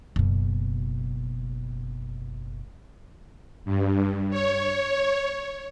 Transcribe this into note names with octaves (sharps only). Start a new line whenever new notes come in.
F#1 B2
G2
C#5